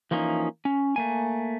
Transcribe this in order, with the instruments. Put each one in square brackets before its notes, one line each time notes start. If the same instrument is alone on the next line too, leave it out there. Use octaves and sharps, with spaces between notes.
[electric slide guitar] E3 F3 A#3 C#4 D#4
C#4
A3 A#3 G#5